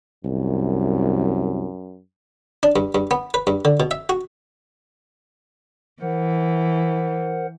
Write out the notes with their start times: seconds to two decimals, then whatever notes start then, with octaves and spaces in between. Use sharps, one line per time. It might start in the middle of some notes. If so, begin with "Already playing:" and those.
0.25 C2 F#2
2.63 D4
2.76 G2
2.95 G2
3.11 B3
3.34 B4
3.47 G2
3.65 D3
3.80 B2
3.91 E5
4.09 F#4
6.01 E3 A#4 C5 F#5